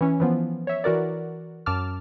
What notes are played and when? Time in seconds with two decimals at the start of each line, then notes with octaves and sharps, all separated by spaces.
0.01 E3 C#4
0.20 E3 F3 B3
0.67 C#5 E5
0.84 E3 F#4 A#4 D5
1.66 F#2 A5 D6 F6